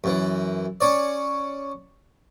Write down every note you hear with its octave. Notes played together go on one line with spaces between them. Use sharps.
F#2 E3
C#4 C#5 D5